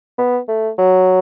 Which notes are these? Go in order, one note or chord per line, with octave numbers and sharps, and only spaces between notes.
B3
A3
F#3